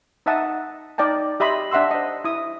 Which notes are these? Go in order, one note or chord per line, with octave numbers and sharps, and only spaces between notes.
D#4 D#5 E5 F#5 A5 D#6
D#4 D5 D#5 G5 A5
G4 D#5 E5 B5 C6
D4 E5 F#5 C6 E6
C5 D#5
E4 D#6